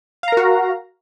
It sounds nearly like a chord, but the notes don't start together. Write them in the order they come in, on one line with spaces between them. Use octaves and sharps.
F5 A#5 A#4 F#4